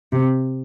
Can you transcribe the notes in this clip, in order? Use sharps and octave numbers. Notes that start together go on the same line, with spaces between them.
C3